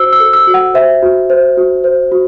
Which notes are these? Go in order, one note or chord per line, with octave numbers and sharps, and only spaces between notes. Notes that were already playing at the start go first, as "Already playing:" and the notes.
Already playing: F#4 C5 E6
E6
A4
E6
F#4
F#5
C5 E5
F#4
C5
F#4
C5
F#4